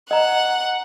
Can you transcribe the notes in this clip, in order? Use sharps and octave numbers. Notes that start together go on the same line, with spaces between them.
D#5 F#5 A#5